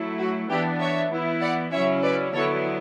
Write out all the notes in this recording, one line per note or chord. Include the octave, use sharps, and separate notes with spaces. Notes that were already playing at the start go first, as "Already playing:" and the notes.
Already playing: F#3 A3 E4
F#4
E3 B3 D4 E4 G4
C#5 E5
E3 B3 E4
D5 F#5
C#3 F#3 C#4 E4 C#5 E5
B4 D5
D3 F#3 B3 E4 A4 C#5